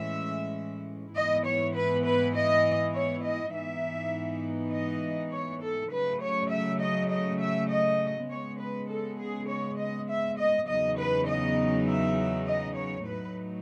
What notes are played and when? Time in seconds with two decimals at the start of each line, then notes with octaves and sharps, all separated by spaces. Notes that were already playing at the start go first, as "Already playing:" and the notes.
Already playing: A2 E3 G#3 C#4 E5
1.15 G#2 E3 B3 E4 D#5
1.46 C#5
1.75 B4
2.05 B4
2.35 D#5
2.94 C#5
3.24 D#5
3.53 G#2 E3 B3 D#4 E5
4.72 D#5
5.32 C#5
5.63 A4
5.92 C#3 F#3 A3 B4
6.22 C#5
6.51 E5
6.82 D#5
7.11 D#5
7.41 E5
7.71 D#5
8.30 C#3 G#3 B3 C#5
8.59 B4
8.89 A4
9.20 G#4
9.48 C#5
9.78 D#5
10.09 E5
10.38 D#5
10.68 E2 C#3 F#3 B3 D#4 D#5
10.98 B4
11.28 D#5
11.87 E5
12.47 D#5
12.76 C#5
13.07 A2 F#3 A3 D#4 B4